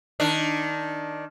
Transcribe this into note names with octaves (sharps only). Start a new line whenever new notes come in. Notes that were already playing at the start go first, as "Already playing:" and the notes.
D#3 D4